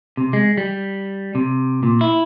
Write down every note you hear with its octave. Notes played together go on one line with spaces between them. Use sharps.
C3
G#3
G3
C3
A#2
E4